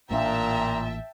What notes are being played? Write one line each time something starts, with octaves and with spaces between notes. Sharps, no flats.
A1 A#2 A#3 D4 E5 G5 A5 A#5